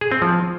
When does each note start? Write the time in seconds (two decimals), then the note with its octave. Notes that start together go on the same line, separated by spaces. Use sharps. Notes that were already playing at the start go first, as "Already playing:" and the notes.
0.01 G#4
0.12 C4
0.22 F3